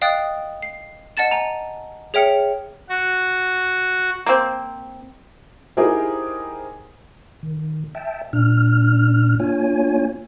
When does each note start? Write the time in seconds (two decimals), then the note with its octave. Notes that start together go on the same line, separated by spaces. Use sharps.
0.02 D#5 F5 G5 D#6 F#6 A6
0.63 C7
1.17 D#5 F#5 A5 A6 E7
1.31 G#5 A#5
2.14 G#4 C#5 E5 G5 F6 C#7
2.89 F#4
4.26 A#3 C4
5.77 D#4 E4 G4 G#4 A#4 C5
7.43 D#3
7.95 E5 G5 A5
8.33 A#2 D4 F6
9.40 A#3 D4 F4 C#5 G#5